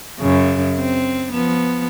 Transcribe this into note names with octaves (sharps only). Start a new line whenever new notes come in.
F#2 C#3
C4
F3 B3